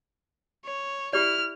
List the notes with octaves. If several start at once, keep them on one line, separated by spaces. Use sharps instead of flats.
C#5
E4 G4 D5 F6